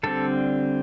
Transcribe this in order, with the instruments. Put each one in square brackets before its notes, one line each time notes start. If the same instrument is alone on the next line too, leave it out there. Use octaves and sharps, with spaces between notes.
[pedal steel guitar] D3 G3 C4 A4